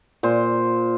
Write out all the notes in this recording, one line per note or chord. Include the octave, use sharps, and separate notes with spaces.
A#2 C5